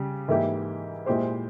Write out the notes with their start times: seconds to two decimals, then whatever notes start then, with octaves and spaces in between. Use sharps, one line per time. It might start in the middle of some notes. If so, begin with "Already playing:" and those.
Already playing: C#3 G3
0.28 G#2 E3 A#3 E4 G4
1.06 A#2 G#3 E4 G4 C5